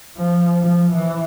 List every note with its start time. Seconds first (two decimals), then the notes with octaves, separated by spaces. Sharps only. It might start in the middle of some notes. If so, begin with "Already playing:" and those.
0.18 F3
0.62 F3
0.93 E3